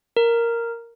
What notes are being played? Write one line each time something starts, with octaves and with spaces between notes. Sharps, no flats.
A#4